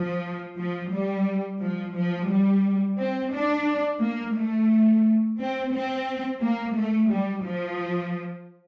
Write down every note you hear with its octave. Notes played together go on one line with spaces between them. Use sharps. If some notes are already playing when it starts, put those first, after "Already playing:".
Already playing: F3
F3
G3
F3
F3
G3
C4
D4
A#3
A3
C4
C4
A#3
A3
G3
F3